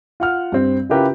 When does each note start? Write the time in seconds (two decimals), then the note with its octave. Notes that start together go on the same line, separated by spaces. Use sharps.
0.20 F4 F#5 F6
0.52 G2 C4
0.89 C#3 E4 F4 G4 A#4 B4